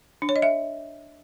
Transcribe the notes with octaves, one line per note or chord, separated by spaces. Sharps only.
D4
C#5
D#5
E5